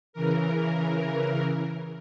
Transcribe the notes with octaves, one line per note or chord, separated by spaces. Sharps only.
C#3 E3 A#4